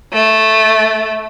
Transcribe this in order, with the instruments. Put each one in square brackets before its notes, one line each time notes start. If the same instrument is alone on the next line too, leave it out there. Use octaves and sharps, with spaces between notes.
[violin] A3